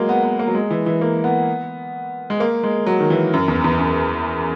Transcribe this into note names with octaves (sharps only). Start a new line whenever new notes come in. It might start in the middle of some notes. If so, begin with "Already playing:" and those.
Already playing: F#3 G#3 A#3
B3
B3
A#3
F#3
G#3
E3
E3
A#3
B3
G#3
A#3
G#3
F#3
D#3
E3
F#2
E2
E2
F#2